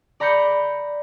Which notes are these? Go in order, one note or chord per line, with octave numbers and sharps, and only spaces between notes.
D5 A#5 B5 G6 C#7